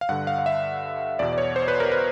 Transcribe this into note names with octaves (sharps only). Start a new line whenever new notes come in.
F5
G2 D3 F#5
F5
F5
E5
E2 B2 D5
D5
C#5
C5
B4
A#4
B4